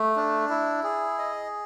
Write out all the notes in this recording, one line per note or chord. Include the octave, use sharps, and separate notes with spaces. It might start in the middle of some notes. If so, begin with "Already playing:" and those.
Already playing: A3
D4
E4
G#4
D#5